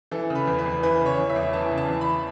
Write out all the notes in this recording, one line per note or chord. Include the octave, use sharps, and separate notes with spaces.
E3 A4
C#3
B4
E2
B4
E2
E3 B4
C#3 C#5
E2
E5
E2
E3 A5
C#3
A5
E2
B5